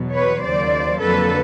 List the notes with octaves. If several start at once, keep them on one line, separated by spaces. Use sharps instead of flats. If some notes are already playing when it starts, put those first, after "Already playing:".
Already playing: E2 B2 F#3
B4 C#5
D#2 C#3 F#3 A#3 C5 D5
F2 D3 F#3 A#3 A4 B4